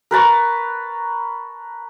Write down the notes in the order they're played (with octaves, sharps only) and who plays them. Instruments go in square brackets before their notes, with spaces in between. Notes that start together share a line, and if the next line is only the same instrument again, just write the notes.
[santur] A#4 B4 A5 C#6